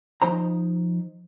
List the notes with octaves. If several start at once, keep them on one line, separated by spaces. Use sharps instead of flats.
F3 D#4 C5 A#5